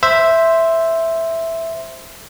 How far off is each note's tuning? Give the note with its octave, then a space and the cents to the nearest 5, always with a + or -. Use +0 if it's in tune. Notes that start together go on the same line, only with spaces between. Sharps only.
C5 +0 E5 +0